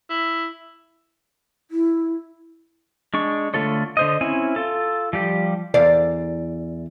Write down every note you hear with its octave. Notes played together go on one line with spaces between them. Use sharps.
E4
E4
G#3 D4 C#6
D3 A3 F4 A4 C#5
D3 C5 D#5
C4 C#4 E4 G#5
F4 A4
F3 G3 G4
E2 D5 F5